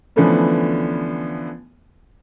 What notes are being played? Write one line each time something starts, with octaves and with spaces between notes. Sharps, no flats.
D3 E3 F3 A3 B3 C#4